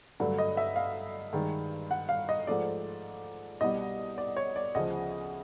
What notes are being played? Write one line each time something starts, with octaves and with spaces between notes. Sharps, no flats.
G2 D3 F#3 A3
D#5
E5
F5
G2 D#3 G#3
F#5
F5
D#5
G#2 F3 A3 D5
C2 B2 G3 D#5
D5
C#5
D5
D2 C#3 F3 D#5